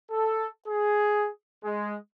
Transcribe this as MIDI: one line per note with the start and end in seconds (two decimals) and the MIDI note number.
0.11 0.47 69
0.68 1.29 68
1.64 1.96 56